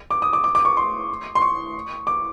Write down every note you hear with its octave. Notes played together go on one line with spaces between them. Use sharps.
D6
D#6
D6
D6
D6
C#6
C6
C6
C#6
D6